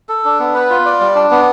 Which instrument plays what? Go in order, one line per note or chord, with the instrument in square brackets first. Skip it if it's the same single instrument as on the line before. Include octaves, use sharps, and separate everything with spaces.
[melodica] A4
D4
B3
B4
F4
D5
G3
D4
B3